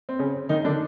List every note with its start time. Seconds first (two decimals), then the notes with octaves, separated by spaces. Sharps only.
0.09 C4
0.19 C#3 C#4
0.49 D#3 D#4
0.65 D3 D4